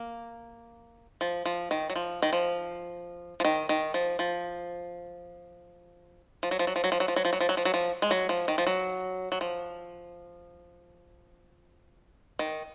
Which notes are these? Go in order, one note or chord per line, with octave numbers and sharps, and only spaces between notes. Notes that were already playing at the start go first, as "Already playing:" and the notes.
Already playing: A#3
F3
F3
D#3
F#3
F3
D#3
F3
F3
D#3
D#3
F3
F3
F3
F#3
F3
F#3
F3
F#3
F3
F#3
F3
F#3
F3
F#3
F3
F#3
F3
F#3
F3
G#3
F#3
F3
D#3
F3
F#3
F#3
F3
D#3